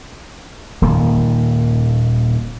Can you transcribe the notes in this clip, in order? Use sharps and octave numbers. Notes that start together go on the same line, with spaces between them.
D#1 A#2 D#3 A#3